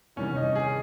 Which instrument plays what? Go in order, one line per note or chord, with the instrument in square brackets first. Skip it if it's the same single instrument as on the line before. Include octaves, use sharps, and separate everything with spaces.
[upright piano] E2 C3 D#3 G3 [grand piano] C#4
[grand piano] D#4
G#4